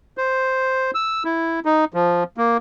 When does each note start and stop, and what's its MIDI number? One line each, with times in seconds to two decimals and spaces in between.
0.17 0.91 72
0.94 1.23 88
1.25 1.60 64
1.65 1.85 63
1.94 2.24 53
2.37 2.57 58